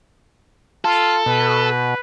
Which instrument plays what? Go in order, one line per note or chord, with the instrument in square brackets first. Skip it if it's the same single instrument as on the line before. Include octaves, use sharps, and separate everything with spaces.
[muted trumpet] F4 [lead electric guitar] A4
[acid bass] B2 [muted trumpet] B4